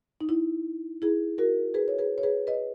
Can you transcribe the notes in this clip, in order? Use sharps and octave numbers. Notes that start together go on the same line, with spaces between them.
D#4
E4
E4 G#4
F#4 A#4
G#4 B4
C#5
G#4 B4
C#5
G#4 B4
B4 D#5